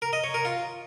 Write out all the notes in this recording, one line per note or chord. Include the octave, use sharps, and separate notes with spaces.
A#4
D#5
C#5
A#4
F4